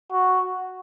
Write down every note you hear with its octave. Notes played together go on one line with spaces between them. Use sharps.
F#4